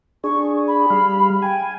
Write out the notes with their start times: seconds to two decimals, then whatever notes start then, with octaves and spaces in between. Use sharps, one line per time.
0.24 D4 G#4 C#6
0.67 B5
0.90 G3 F5
1.42 G5 G#5